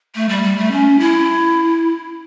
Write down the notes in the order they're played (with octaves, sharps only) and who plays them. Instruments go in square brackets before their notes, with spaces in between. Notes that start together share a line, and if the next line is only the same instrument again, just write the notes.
[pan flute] A3
G3
G3
A3
C#4
E4